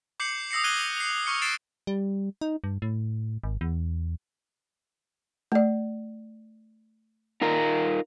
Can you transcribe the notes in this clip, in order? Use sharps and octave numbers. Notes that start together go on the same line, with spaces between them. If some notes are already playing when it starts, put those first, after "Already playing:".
D6 G6 C7 C#7 F#7
D#6 E6 A#6 C7 C#7
F#6 G#6 D#7 G7
C7 F7
C#6 F6 C#7
A6 C7 D7 E7 G7
G3
D#4
G2
A2
G#1
E2
A3 D5
D#4 F4 A#4